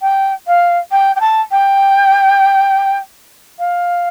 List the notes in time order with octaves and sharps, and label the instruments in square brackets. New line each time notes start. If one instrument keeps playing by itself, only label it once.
[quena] G5
F5
G5
G5
A5
G5
F5